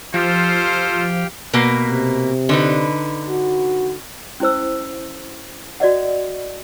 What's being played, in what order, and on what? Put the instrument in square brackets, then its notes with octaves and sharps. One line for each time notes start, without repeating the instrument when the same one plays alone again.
[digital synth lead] F3 [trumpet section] F4 A4 C5 [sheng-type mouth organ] G4 F5 G5
[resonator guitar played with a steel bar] B2 A#3 B4
[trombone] C3
[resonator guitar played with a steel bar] D3 D#4 B4
[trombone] F#4
[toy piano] C#4 E4 C5 E6
F#4 D5 D#5 F#5